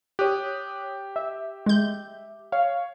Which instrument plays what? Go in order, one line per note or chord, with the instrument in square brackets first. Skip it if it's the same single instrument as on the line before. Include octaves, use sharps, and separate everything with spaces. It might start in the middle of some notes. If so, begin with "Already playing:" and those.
[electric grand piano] G4 [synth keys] C#5 D#6 F#6
[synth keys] E5
[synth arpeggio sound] G#3 G6
[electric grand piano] C#5 [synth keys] F5